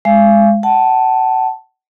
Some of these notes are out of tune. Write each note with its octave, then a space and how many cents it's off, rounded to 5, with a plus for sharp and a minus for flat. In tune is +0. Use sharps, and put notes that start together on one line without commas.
G#3 +0 F5 -35
F#5 +30 A5 +0